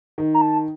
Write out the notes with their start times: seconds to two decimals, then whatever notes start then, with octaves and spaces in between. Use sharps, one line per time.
0.18 D#3
0.34 A#5
0.41 A5